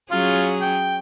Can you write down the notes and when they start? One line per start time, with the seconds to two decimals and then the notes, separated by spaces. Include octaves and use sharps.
0.11 F#3 C#4 F4 G#4
0.61 G5